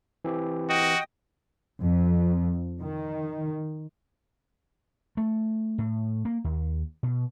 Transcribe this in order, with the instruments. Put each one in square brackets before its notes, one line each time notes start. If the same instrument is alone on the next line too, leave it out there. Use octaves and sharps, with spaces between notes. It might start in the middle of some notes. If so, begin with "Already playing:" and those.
[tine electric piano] E3 C4 G4
[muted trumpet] F#4 [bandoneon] D#5 G5 D#6
[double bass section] F2
D#3
[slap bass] A3
A2
A#3
D#2
B2